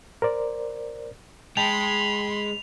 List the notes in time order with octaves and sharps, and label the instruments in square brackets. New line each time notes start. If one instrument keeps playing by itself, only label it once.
[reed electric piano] A#4 C5 D5
[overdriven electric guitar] G#3 [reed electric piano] G5 A5 [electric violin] B5 C6 [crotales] F7